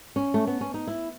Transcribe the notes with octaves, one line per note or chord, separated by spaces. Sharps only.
C#4
A3
B3
C#4
D#4
E4